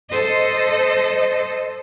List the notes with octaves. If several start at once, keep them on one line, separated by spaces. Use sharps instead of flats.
A4 C5 D#5